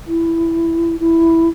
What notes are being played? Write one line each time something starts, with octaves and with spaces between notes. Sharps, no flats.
E4
E4